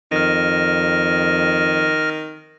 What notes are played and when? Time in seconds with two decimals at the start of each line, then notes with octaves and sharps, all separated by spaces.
0.12 F2 D#3 F6 A#6